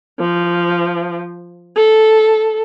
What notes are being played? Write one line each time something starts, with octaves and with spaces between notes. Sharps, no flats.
F3
A4